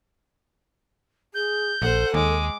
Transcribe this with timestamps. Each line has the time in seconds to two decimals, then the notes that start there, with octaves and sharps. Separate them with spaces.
1.34 G#4 G6
1.82 A#1 A4 C5 F#5
2.14 D#2 G#3 D6